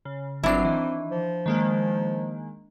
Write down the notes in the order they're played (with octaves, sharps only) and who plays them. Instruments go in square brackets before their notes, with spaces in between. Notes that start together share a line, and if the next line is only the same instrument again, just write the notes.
[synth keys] C#3
[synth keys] G1 F#3 C7 [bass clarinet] C4 [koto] D4 E4
[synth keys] D#3 E3
[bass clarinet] F3
[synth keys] D#3 G#3 A#3